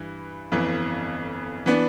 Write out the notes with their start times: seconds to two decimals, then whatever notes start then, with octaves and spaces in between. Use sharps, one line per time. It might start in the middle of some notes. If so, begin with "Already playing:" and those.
Already playing: G2 E3
0.52 G1 F2 E3
1.66 E3 B3 D4